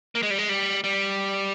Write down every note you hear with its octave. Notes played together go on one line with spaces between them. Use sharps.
A#3
G#3
G3
G#3
G3
G3